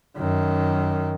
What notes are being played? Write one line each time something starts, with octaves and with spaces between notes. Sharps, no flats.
F#2 D#3